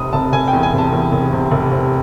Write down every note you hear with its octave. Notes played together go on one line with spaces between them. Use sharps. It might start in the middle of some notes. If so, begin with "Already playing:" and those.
Already playing: F1 C3 D#6
F1 A5
F1 G#5
G5
E2
G#5
C3 A5
E2
F1
C3
F1
C3